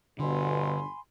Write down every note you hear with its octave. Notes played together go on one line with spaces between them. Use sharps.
G1 B2 D3 G#5 B5 C6